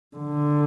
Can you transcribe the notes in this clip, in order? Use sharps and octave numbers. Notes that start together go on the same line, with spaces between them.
D3